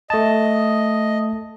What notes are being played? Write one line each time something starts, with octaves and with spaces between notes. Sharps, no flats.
A3 D#5 A5